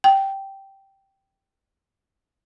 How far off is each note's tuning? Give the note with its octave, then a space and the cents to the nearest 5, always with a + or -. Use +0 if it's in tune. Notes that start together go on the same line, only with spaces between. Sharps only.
G5 -10